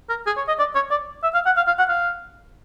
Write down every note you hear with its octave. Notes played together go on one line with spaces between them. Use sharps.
A#4
G#4
C#5
D#5
D5
C#5
D5
E5
F5
F#5
F5
F5
F#5
F5